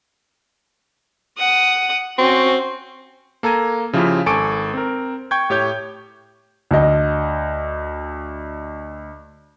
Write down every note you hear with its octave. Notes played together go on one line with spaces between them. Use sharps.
F#5 D#6
C4 C#4 F#4
A#3 A4 A#5 G#6 D#7
C#3 F3 E4 F4 G4
G#1 A4 G#5 C#6 D6 D7
C4 A#4
G5 C#6 G6 G#6
A2 G4 C#5 G6 G#6
D2 D#5